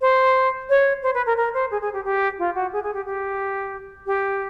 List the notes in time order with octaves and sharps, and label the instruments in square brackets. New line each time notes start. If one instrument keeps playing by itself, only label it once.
[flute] C5
C#5
C5
B4
A#4
A#4
C5
G#4
G#4
G4
G4
F4
F#4
G#4
G#4
G4
G4
G4